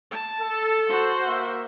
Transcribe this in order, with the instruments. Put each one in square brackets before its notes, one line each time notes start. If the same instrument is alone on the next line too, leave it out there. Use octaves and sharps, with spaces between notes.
[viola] A5
[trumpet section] A4
[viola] F#4 C5
[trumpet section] A#3 E5